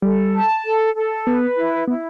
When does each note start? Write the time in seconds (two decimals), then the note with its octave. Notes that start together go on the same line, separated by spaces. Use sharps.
0.02 G3 A4
0.34 A5
0.64 A4
0.95 A4
1.27 B3 B4
1.57 E4
1.88 B3 E4